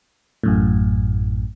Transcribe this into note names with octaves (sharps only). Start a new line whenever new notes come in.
A1 F#2 A2